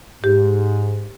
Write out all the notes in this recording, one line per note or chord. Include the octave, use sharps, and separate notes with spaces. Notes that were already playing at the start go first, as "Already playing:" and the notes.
G#2 G4